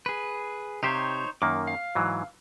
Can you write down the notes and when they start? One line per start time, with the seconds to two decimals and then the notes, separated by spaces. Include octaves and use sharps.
0.06 G#4 B4
0.83 C3 D#4 G4 C5 C#5 F5
1.42 F#2 D#3 A#3 D6
1.67 F5
1.95 G#2 E3 F#3